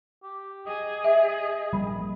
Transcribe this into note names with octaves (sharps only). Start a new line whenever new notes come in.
G4
G#4 D#5
E5
A#1 G3 A#3 B5